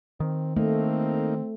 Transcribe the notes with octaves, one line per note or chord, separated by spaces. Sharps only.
D#3 C4
A3 A#3 C4 D#4